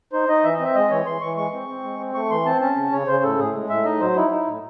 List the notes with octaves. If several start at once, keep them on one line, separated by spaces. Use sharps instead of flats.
D#4 C5
D#4 D#5
E3 E5
D#5
C4 E5
G#3 D#5
E3 C#5
E3 C6
E3 C#6
G#3 C#6
C4
C4
G#3
C4
A3 C#6
E3 C6
C4 A5
C#4 A5
C#3
C#3 C#5
C#3 C5
A2 A4
A2 G#4
G#3
A2 E5
D#4 D#5
F#3 C5
D#4 E4
D#4
A2